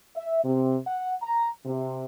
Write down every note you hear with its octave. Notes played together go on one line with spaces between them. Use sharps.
E5
C3
F#5
A#5
C3